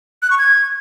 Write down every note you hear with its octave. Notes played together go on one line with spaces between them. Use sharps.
F#6
C#6
G#6